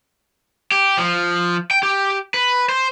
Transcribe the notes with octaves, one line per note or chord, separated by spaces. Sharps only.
G4
F3
G5
G4
B4
C5